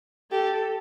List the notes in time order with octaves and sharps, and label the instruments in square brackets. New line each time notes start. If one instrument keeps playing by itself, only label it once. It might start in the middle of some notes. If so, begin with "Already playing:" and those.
[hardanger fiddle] G4 [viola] A4